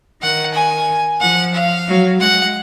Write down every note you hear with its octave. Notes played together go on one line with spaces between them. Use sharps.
D#3 F#5
G#5
F3 F#5
F5
F#3
G#3 F#5